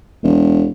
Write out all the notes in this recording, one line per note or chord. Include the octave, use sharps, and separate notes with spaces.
E1